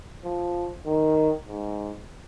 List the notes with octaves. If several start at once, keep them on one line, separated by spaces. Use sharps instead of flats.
F3
D#3
G#2